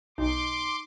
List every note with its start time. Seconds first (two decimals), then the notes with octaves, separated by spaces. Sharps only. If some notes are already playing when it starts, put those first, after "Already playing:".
0.18 B1 D#4 C6 D6